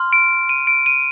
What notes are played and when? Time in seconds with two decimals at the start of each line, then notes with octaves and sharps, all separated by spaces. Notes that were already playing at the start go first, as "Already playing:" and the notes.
Already playing: C6 F6
0.13 D7
0.49 D#7
0.67 D7
0.86 D#7